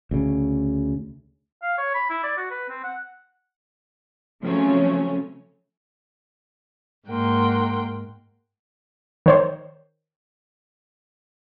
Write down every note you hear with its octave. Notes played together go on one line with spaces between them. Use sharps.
D2 C#3
F5
C#5
B5
E4
D5
F#4
B4
C4
F#5
C#3 F3 F#3 A3 C4 C#4
G#2 A#3 A#4 F#5 G5 C6
D#3 C5 C#5